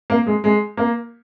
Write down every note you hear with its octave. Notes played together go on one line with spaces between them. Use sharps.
A#3
G#3
G#3
A#3